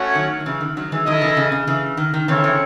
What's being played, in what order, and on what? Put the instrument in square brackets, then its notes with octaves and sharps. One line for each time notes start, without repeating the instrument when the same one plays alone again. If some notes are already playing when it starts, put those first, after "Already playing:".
Already playing: [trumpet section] A3 C#4 F#4 C#5 F#5
[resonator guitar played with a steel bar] D#3 F#3
D#3
C#3 E3
D#3
D#3 F#3
E3 G#3
[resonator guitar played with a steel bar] D#3 F#3 [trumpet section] E4 A4 D#5
[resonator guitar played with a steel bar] C#3 E3
C#3 E3
C#3
C#3 E3
D#3
D#3
[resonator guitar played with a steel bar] C#3 E3 [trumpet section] C4 E4 A4 C#5
[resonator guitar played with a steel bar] C#3 E3